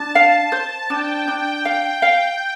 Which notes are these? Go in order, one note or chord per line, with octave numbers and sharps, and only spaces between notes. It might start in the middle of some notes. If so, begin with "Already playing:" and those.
Already playing: D4 A5
F5
C5
D4 G5
D4 G5
F5
F5